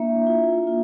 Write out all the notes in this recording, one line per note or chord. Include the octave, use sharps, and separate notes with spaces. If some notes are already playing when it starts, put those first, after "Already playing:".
Already playing: A#3 D4 E4 E5
F4
F4